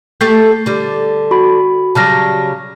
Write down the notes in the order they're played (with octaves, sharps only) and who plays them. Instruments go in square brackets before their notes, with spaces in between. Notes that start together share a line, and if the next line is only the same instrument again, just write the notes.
[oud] A3 G4 [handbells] G6 C7
[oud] D3 G3
[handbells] F#4 B5
[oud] C#3 F#3 G3 [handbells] A5 F6 A#6